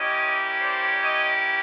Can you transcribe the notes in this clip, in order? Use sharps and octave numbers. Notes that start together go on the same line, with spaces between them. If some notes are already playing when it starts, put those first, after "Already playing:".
Already playing: A#3 C#4 E4 G4 C#5 D#5
C5 D5
C#5 D#5